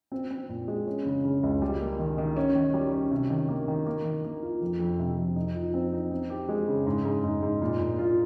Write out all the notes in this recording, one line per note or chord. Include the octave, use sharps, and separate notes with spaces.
C4
C4
A#2
G#3
C#4
C#3
C#3
C#2
G3
A#3
D#3
D#3
C#4
D#3
G3
C#4
C3
D#3
A#3
D#3
A#3
D#3
A#3
F4
F2
F2
C3
F2
D#4
F3
C4
D#4
C4
G4
G#3
C#3
G#2
G#2
G#2
G#2
A#2
A#2
F4